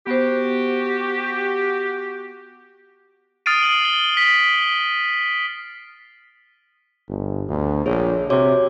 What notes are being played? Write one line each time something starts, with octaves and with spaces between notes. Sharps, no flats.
B3 F#4 G4 C5
D#6 F6 A6 C7 D7 D#7
C7 F#7
G7
B6
G1
D2
A#1 G#4 C#5
C3 F#4 C#5 D6